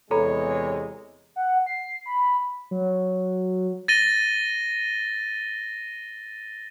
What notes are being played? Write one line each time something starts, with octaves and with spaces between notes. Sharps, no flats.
E2 C3 G#3 A4 C#5 A#5 B5
F#5
C7
B5
F#3
A6 A#6 D#7 G7